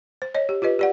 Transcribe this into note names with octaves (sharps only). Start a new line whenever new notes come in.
C5
C#5 D#5
G4
F4 G4 B4 D#5
G4 D5 F#5